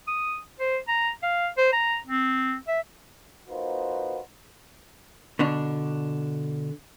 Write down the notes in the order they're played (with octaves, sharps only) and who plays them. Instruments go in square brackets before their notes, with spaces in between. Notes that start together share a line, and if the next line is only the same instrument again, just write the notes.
[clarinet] D#6
C5
A#5
F5
C5
A#5
C4
E5
[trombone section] A#3 D#4 F4 F#4 B4 C5
[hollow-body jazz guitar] B2 D3 D4